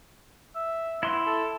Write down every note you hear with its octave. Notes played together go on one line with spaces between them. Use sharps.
E5
B3 E4 C6
A4